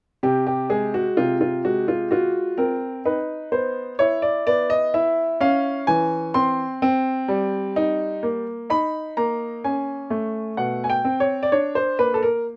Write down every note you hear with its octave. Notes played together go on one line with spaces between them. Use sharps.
C3 G4
G4
G#3 G#4
F#4
C3 F4
F4
G#3 F#4
F4
F4 F#4
C4 A#4
D#4 B4
B3 C5
E4 C#5
D5
B3 D5
D#5
E4 E5
C#4 F5
E3 G#5
C4 C6
C4
G3
D#4
A#3
D#4 B5
A#3 A#5
C#4 G#5
A3
B2 F#5
G#5
G5
C4
C#5
D5
D4 C#5
C5
A#3 B4
A4
A#4